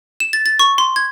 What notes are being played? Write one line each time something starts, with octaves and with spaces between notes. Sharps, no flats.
E7
A6
A6
C#6
C6
G#6